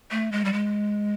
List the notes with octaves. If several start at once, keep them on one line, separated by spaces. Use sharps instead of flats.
A3
G#3
G3
G#3